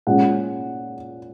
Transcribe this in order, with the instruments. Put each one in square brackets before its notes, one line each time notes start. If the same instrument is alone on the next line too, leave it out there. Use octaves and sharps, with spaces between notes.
[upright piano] A#2 G#3 C#4 F#5